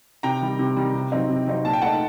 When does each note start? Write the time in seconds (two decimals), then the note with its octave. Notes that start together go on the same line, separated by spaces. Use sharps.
0.23 C3 G5 A#5
0.41 D#3 G3
0.59 C3
0.77 D#3 G3
0.94 C3
1.12 F#3 C4 D#4
1.29 C3
1.47 F#3 C4 D#4
1.65 A#2 A5
1.73 G5
1.82 A3 D#4 F#5 A5